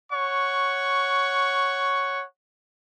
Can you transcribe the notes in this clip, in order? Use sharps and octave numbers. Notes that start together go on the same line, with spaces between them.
C#5 F#5 C#6